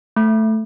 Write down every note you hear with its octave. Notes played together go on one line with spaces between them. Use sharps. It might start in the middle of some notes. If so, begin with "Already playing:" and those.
A3